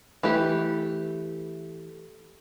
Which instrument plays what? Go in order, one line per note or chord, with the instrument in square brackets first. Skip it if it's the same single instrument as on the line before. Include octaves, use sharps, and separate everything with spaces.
[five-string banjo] E3 A3 G4